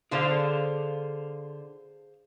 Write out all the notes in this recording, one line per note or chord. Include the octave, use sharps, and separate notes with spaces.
D3 F4 G#4 C5 F5